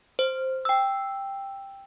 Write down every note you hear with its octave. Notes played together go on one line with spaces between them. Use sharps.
C5
G5 E6